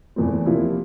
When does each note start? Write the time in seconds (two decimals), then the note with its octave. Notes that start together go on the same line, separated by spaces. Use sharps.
0.16 E2 E3 A3 C4
0.46 C3 F3 A#3 E4